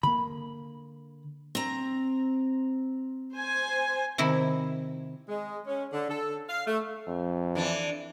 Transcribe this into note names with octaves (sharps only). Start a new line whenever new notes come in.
D3 A#3 B5
C4 A#5
C5 G#5
C3 D#3 E4
G#3
C#4
D3
A4
F5
A3
F2
E3 D4